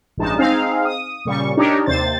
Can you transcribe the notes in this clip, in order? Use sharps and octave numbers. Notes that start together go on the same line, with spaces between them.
A1 G2 G#3 D#4 A5
C4 D#4 G#4 F5
D#6
A#2 C#3 G3 C#6
D4 D#4 G4 A#4 C#5 D5
D#2 C3 C5 A6